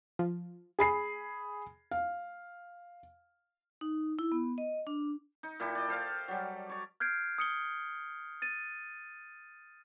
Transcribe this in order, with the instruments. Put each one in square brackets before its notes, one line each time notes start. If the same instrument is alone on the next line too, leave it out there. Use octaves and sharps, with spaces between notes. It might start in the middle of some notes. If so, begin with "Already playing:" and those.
[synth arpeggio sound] F3
[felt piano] G#4 B5 C7
F5
[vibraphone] D#4
E4
B3
D#5
D4
[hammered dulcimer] D#4
A#2 E4 G4 A4
D5 D#5
A4 C5 F5
F#3 G3
C#5 D5
[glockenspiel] F6 G6 G#6 C7 D7
D#6 C#7 G7
A6 D#7